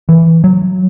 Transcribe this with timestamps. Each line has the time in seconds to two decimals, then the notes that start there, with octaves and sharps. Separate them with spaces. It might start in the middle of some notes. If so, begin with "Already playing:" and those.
0.09 E3
0.44 F#3